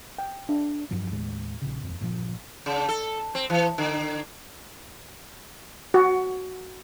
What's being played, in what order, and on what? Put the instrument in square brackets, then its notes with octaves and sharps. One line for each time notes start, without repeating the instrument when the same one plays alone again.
[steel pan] G5
D4
[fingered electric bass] F1 G2 F3 F#3
D#2 A2 G#3
A#1 A#2 C#3
D#1 F2
G1 G2 A#2 F3
[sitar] C#3
A4
C4
E3
D3
[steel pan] F#4